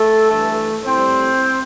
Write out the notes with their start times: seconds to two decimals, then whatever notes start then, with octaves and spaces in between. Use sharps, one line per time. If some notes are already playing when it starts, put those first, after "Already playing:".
Already playing: A3 A4
0.28 G2 E3 A3
0.85 A2 G3 C4 C5